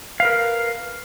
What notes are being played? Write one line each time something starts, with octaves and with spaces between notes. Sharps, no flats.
A#4 B4 F5